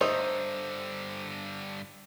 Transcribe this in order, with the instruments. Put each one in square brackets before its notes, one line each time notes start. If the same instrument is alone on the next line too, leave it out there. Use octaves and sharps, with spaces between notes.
[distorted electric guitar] G2 D3 [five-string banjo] A3 D#4 [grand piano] C5